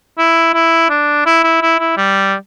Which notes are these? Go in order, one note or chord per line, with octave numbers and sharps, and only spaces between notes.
E4
E4
D4
E4
E4
E4
E4
G3